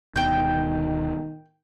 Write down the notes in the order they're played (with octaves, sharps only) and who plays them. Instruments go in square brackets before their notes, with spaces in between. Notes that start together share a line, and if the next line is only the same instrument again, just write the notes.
[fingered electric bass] D1 B2 [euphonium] D#3 [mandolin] G5 G6